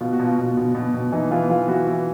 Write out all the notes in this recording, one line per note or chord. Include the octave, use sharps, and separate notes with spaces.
B2 F4
F#4
B2
F4
B2
B2
B2
B2
E3 D#4
E3 F4
E3 F4
E3 F#4
E3